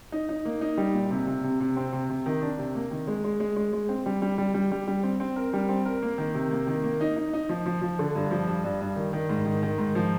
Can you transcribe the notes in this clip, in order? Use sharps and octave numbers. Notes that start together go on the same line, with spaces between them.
D#4
D#4
A#3
D#4
G3
A#2
C3
C3
C3
C3
C4
C3
C3
D#3
D4
C3
A#3
D#3
G#3
G#3
G#3
G#3
G#3
C4
G3
G3
G3
G3
G3
G3
C4
C4
A#4
G3
C4
A#4
A#3
D#3
C3
A#3
D#3
A#3
D#4
D#4
D#4
F3
F3
F3
D3
G2
F3
G2
G2
G2
D#3
D#3
G#2
D#3
D#3
G#2
F3